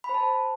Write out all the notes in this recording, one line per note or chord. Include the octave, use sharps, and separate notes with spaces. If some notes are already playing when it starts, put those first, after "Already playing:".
B5
C5
A5